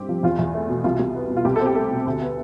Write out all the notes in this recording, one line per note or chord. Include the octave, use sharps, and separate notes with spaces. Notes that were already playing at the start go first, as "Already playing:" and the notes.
Already playing: G2 C4 G4
F3
E2 F4
E2
A3
B2
C2 F4
C2
B3
B2
F4
C2 G4
C4 A4
G4
A3 A4
B2
D2
B3